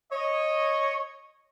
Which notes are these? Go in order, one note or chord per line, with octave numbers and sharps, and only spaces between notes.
C#5 D#5